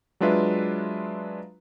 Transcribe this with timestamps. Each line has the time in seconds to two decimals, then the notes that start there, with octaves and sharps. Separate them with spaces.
0.20 F#3 G#3 D4 F4 B4 E5